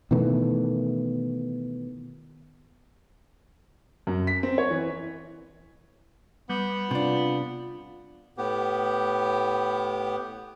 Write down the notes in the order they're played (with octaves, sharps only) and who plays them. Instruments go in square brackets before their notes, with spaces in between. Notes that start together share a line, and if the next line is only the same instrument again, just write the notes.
[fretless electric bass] B2 D#3 E3 A3
[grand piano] F#2
B6
C4
C#5
E3
[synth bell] G3 [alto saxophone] B3
[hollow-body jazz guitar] C3 D4 [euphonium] F4
[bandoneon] A2 B3 G4